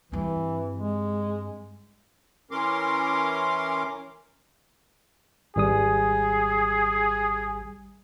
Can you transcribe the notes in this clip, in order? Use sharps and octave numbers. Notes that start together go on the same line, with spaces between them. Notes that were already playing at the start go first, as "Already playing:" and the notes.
G2 E3 C4
G#3
E3 C#4 A#4 C6 D6
G#1 G3 G#4 D#6